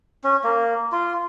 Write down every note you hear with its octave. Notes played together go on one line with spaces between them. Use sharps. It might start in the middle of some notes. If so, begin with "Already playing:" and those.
C#4
A#3
F4